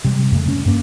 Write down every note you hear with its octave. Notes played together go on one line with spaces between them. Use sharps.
C3 G3
F2 C#3 A3
C#4
G2 A#3